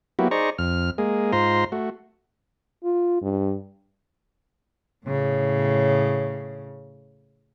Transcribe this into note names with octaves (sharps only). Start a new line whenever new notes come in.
F#3 A#3 B3 E4 F#4 G4
D#4 G#4 C5 D5 A#5 C#6
F2 F6
G#3 A#3 G#4
G#2 F4 C5 A#5 C6
A3 F#4
F4
G2
A2 C#3